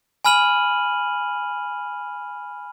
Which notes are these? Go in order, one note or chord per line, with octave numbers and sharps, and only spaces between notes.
G#5 B5 F6 D#7 F#7